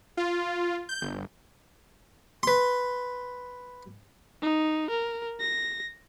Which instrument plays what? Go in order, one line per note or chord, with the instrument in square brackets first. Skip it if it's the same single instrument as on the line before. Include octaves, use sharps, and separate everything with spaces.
[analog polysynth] F4
G6
G1
[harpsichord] B4 C6
[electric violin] D#4
A#4
A#6